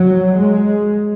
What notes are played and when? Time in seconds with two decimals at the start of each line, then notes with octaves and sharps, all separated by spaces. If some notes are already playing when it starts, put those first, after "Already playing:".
Already playing: F#3
0.37 G#3